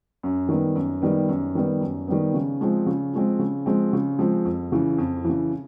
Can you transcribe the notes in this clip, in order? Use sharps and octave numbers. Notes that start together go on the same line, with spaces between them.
F#2
D#3 G3 B3
F#2
D#3 G3 B3
F#2
D#3 G3 B3
F#2
D#3 G3 B3
C#3
F3 G#3 C4
C#3
F3 G#3 C4
C#3
F3 G#3 C4
C#3
F3 G#3 C4
F2
C#3 E3
F2
C#3 E3